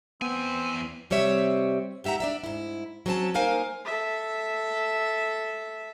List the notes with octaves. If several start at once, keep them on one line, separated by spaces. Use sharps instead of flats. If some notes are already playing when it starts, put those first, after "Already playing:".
E2 B3 C4 G#5
C3 G3 C4 C#5 E5
G#2 G4 E5 F#5 A#5
D4 D5 E5
G#2 E4
F#3 C4 C#4 A#4 A5
A#3 D#4 A#4 C5 F5 G#5
A4 E5